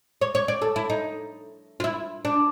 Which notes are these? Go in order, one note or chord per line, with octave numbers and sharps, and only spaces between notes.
C#5
C#5
D5
A4
E4
D#4
F4
E4
D4